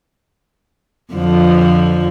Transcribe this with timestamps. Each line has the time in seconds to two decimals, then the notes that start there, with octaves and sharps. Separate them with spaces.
1.13 F2 D3 F3